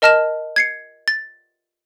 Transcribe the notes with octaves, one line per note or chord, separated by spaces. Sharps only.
A#4 D#5 A5 F6 A#6 E7
G#6 C7 C#7
A6